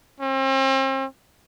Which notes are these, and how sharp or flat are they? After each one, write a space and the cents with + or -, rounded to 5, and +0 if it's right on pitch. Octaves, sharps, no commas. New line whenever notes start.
C4 +40